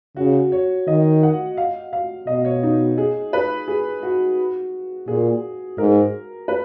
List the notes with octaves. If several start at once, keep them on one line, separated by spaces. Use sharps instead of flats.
C#3 F#4
C#5
D#3 D#5
F#5
F5
F5
B2 D#5
C#5
D#4
G#4
B4
G#4
F#4
A#2 G#4
G#2 A#4
B4